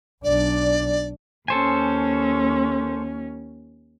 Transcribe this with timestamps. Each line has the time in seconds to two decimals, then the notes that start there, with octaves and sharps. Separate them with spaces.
0.24 B1 D4 D5
1.48 D#2 C#4 A4 C5 G#5